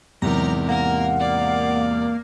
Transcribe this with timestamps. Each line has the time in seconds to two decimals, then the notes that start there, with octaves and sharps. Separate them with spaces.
0.22 E2 G#2 C3 F#3 G4 A#4 A#5
0.69 A#3 A#4 F#5
1.20 D5